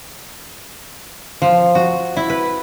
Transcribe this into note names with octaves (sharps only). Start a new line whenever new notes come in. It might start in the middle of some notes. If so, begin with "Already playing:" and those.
F3
F#4
E4
B4